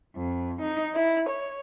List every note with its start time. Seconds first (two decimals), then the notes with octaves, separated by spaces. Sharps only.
0.15 F2
0.61 D#4
0.94 E4
1.28 C#5